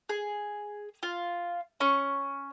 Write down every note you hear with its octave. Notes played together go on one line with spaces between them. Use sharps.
G#4
F4
C#4 C#6